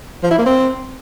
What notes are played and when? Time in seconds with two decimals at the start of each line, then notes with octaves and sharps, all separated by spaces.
0.23 F3
0.31 E4
0.38 A#3
0.46 C4